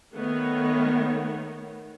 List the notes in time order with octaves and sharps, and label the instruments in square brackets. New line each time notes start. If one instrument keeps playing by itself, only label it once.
[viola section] D#3 A3 B3 C#5